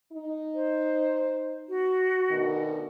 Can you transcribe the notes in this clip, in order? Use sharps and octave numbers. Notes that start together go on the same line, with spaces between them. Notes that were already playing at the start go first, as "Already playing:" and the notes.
D#4
C5
F#4
D2 B2 D#3